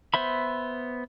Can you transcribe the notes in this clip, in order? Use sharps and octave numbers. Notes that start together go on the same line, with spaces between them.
B3 C5 E5 B5